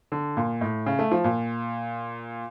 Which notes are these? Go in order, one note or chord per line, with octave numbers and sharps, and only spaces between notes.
D3
A#2
A2
C#3
A3
F3
A#2